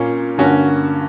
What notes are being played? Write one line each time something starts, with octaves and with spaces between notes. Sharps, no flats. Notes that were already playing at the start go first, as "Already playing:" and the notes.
Already playing: A#2 A#3 C#4
G2 D3 A#3 C#4 F#4